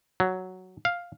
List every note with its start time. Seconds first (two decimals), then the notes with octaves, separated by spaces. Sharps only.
0.20 F#3
0.85 F5